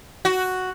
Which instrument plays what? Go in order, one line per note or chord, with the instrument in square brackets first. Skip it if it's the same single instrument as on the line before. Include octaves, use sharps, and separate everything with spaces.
[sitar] F#4